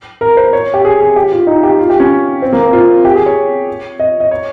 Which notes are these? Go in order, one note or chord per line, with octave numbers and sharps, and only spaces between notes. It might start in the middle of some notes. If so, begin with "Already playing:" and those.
A#4
C5
C#5
G4
G#4
G#4
G4
F4
D#4
G4
F4
G4
C#4
C4
A#3
C4
F4
G4
G#4
C#5
D#5
D#5
C#5